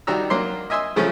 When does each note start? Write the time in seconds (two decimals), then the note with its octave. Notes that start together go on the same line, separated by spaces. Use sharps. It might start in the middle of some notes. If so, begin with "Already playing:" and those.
0.07 D#3 G3 D4 F#4 A#5 E6
0.30 F#3 A#3 D5 C6
0.70 D#5 E5 G#5 C6 E6
0.96 C#3 F3 F#3 A3 C#4